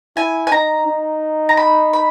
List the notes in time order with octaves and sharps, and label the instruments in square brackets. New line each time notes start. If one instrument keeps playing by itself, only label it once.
[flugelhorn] E4 [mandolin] G#5
[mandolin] G#5
[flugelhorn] D#4 [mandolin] A#5
[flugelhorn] D#4
[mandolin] A#5
B5
B5